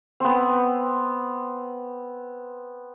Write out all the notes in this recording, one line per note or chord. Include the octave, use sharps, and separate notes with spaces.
B3 C4